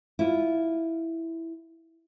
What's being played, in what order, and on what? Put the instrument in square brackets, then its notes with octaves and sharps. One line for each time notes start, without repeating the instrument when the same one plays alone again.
[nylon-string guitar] E4 F4